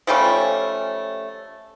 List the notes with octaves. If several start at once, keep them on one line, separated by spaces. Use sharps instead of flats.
F3 G3 A3 C#4